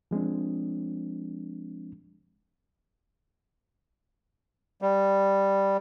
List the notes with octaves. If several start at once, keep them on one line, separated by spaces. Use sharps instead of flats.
F3 G#3 C4 D4
G3